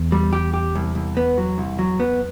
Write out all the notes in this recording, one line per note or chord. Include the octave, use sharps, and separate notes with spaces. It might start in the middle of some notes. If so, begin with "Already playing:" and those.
Already playing: E2
G3
G4
G4
C2
C2
B3
F#3
C2
F#3
B3